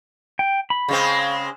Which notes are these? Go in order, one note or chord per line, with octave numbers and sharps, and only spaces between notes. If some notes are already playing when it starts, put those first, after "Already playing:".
G5
B5
C#3 G#3 C4